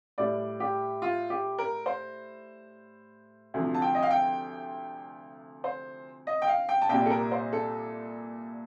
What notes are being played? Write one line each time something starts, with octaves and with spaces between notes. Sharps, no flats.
A2 G3 D5
G4
F4
G4
A#4
C5
D2 C3 F3
A5
G5
D#5
F5
G5
C5
D#5
G5
F5
G5
A5
C2 A#2 G3 G5
A4
A#4
C5
A4